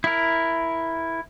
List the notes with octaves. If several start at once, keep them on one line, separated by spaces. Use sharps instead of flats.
E4 A#4